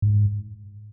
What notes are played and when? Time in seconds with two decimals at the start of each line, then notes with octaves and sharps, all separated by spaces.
0.02 G#2